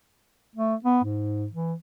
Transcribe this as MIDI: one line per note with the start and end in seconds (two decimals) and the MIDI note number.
0.56 0.75 57
0.85 1.03 59
1.04 1.47 44
1.53 1.74 52